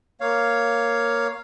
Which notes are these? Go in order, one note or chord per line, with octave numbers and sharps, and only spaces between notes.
A#3 C#5 F5